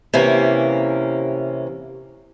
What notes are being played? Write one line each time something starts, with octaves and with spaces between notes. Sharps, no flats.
C3 E3 A#3 C#4